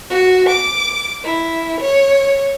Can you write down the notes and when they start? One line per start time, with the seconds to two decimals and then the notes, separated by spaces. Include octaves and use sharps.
0.10 F#4
0.50 D6
1.25 E4
1.81 C#5